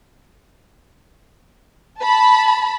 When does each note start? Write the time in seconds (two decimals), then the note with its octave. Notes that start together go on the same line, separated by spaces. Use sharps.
2.01 A5 B5